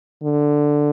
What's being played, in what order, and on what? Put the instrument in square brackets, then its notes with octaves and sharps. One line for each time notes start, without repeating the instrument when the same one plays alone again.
[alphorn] D3